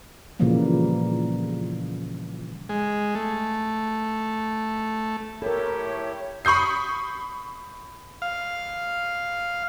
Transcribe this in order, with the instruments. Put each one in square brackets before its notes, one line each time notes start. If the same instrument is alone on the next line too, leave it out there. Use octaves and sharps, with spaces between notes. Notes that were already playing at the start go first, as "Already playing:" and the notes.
[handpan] A#2 C#3 E3 F3 G3 A#3
[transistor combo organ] G#3
A3
[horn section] A2 E4 G4 [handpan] A4 A#4 [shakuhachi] C#5
[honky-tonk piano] B5 C#6 D#6 G6 C7
[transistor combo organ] F5